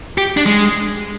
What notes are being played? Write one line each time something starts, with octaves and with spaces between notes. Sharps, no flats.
G4
D4
G#3